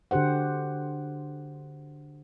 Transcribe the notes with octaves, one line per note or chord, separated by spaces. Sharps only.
D3 F#4 G4 C5 F#5